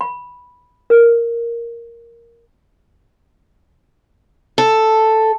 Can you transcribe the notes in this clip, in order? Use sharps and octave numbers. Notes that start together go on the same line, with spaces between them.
B5
A#4
A4